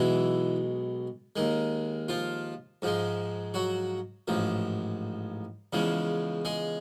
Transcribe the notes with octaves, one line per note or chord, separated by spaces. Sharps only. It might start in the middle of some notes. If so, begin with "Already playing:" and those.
Already playing: B1 B2 E3 G#3 E4
D#2 D#3 G#3
F3 F4
G#2 F3 G#3
F#3 F#4
A1 G#2 F3
E2 C#3 F3 G#3
G#3 G#4